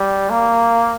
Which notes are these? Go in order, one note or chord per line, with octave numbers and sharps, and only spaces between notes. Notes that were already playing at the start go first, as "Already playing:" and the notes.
Already playing: G3
A#3